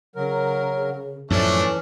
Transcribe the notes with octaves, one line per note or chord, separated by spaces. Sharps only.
C#3 F#3 A#4
F#2 A2 E3 F3 A3 C#4 D4